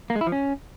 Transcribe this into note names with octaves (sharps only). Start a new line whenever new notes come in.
A#3
G#3
E4
F3
C#4